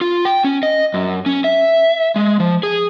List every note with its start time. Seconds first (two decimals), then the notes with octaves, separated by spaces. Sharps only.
0.01 F4
0.25 G5
0.44 C#4
0.63 D#5
0.94 F#2
1.26 C#4
1.44 E5
2.16 G#3
2.40 F3
2.63 G#4